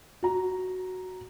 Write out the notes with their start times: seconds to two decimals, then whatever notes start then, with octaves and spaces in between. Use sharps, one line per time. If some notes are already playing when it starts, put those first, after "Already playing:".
0.23 F#4 A#5